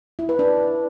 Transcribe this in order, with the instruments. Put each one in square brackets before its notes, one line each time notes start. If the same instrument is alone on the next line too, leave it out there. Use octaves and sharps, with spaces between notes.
[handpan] E4
B4
D4